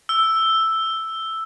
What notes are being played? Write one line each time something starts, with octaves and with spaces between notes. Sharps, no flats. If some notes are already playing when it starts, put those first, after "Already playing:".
E6